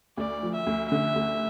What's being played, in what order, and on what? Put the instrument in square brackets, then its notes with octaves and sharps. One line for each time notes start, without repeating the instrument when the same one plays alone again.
[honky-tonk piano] D2 [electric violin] D5
[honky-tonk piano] F3
[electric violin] E5
[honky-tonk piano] D2
[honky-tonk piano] D3 [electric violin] E5
[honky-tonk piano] D2